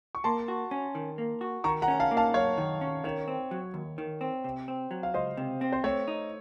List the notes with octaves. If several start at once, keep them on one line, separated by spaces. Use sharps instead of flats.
C#6
A#3 A5 C6
F#4
C#4
D#3
A#3
F#4
D#3 A#5 C#6
F#5 A#5
C#4
F5 A5
A#3
F5 A5
F#2 C#5 F5
D#3
C#4
D#3 C#5
C4
F#3
D#2
D#3
C4
C3
C4
F#3
F5
C#2 C5 D#5
C3
C4
C5
A3 C#5
D#4